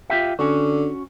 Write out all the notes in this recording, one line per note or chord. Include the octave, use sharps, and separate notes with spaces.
F4 G4 E5
D3 C#4 F#4